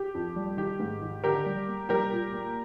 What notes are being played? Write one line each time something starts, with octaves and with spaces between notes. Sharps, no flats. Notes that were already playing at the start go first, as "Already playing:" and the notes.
Already playing: G4
F2
G3
D#3 G4
G#2
D#3
D3 G4 A#4
G3
A#3
G3 G4 A#4
A#2
A#3